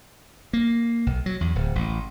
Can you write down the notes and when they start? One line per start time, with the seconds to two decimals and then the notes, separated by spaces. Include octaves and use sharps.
0.53 A#3
1.06 B1
1.26 F#3
1.41 E2
1.55 D1
1.75 A1